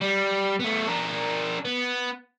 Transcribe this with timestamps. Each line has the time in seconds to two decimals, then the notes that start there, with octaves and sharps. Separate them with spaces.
0.02 G3
0.60 A3 B3
0.87 D4 A#4
1.65 B3